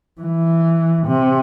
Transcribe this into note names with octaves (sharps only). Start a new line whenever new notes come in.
E3
C3